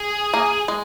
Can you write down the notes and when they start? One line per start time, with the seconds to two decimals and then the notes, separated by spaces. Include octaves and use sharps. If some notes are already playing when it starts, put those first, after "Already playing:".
Already playing: G#4
0.34 A#3
0.68 G#3